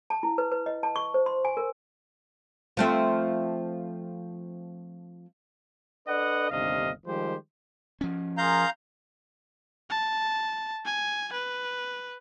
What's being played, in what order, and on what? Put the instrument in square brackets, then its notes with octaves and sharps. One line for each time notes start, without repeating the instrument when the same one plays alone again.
[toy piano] A5
E4
B4
B4
D#5
A5
C#6
C5
C6
G#5
A#4
[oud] F3 A3 C4
[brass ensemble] D4 A4 B4 D5 D#5 F#5
G1 D#2 C3 D4 D#5 F5
D#3 F3 G3 G#3 G4 C5
[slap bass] F3 C#4
[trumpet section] F4 G#4 A#4 [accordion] F5 A#5 G6
[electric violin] A5
G#5
B4